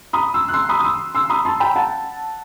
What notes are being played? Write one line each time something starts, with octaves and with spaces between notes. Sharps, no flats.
B5 D#6
C6 E6
F#6
C6 E6
B5 D#6
D#6
C6 E6
C6 E6
B5 D#6
A5 C6
G5 B5
F#5 A5